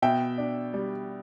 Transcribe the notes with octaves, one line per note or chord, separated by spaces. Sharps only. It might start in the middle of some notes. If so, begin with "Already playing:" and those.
B2 E5 G5
D4
G3